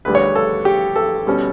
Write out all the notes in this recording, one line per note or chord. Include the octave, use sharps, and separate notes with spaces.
D2 D3 G3 B4
C#5
A4
G4
A4
B2 G3 C#4